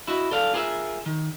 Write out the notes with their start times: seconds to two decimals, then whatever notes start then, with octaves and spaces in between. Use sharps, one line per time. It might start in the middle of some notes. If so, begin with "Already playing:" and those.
0.08 E4 F#4 D#5
0.31 A4 D5 F5
0.54 F4 G#4 A#4 D5 E5
1.06 D#3